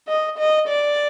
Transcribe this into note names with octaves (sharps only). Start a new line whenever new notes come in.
D#5
D#5
D5